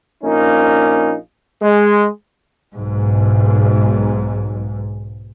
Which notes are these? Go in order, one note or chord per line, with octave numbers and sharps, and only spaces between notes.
A#1 A#3 C#4 D#4
G#3
B1 G#2